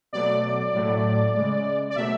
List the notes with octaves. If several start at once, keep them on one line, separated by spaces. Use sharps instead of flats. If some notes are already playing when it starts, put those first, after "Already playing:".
B2 F#3 A3 D5
A2 F#3 A3
C#3 G#3
D5
B2 F#3 A3 E5